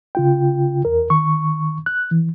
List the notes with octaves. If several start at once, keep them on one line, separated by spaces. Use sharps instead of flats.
C#3 F4 G5
E2 A#4
D#3 C#6
F#6
E3